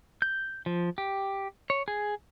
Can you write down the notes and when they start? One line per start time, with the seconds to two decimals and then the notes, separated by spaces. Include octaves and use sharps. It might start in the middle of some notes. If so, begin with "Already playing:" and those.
0.22 G6
0.66 F3
0.98 G4
1.70 C#5
1.88 G#4